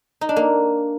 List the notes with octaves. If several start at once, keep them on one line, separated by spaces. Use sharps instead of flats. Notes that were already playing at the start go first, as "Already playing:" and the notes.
D#4
D4
A#3